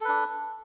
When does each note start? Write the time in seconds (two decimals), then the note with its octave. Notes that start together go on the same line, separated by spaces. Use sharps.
0.01 A4
0.05 B4
0.08 D4